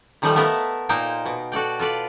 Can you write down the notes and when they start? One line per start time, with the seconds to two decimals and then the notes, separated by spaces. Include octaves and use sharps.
0.22 A#2 D#3 F3 G3 A3
0.36 A3 B3 A#4 E5 A5
0.89 A#2 A#3 D#4 C5 G5
1.26 B2
1.52 F#4 A4 D5 G5
1.80 F4 A4 B4 D5